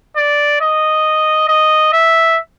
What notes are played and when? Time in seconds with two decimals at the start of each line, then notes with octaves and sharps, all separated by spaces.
0.17 D5
0.61 D#5
1.48 D#5
1.93 E5